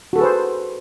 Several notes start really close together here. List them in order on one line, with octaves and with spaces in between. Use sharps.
F#4 A4 G#4 B4 C5